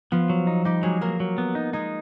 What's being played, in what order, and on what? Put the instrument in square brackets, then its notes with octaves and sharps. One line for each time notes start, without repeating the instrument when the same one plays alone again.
[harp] F3 F4 [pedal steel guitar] B3
[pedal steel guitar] F#3
D#4
[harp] G3 G4 [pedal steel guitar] D#4
[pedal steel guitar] F#3 [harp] G#3 G#4
[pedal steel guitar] F#3 [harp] A#3 A#4
[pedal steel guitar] F#3
B3
D#4
[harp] G#3 G#4 [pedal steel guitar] D#4